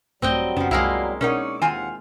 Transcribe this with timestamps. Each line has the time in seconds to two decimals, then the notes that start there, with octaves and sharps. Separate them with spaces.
0.22 A#1 G2 F#3 G3 A3 C4 D#5 G5
0.56 F#2 C#3 F3 B3 C#4
0.71 C2 G#3 A#3 E4 F4
1.21 B2 C#4 D#4 A#4 C#5 D5 F#5
1.62 D#2 D#3 C4 F4 F#5 G#5